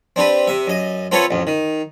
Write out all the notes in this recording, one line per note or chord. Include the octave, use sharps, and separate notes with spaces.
C4 D4 G4 B4
C3 E5
F#2 D#5
C4 F4 A4 B4 C#5 E5
A1 F2
D#3